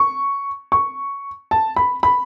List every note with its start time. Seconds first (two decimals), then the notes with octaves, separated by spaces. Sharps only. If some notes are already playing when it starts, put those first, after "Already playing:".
Already playing: C#6
0.72 C#6
1.51 A5
1.76 B5
2.03 B5